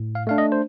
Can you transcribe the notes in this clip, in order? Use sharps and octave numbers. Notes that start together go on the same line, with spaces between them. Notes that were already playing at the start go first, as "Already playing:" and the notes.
Already playing: A2
F5
A3 D4 F5
D#5
C5